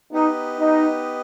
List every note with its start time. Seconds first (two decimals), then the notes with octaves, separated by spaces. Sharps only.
0.11 B3 D#4 G4 B4 D#5
0.57 D#4